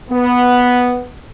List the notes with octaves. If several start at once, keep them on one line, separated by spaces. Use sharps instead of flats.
B3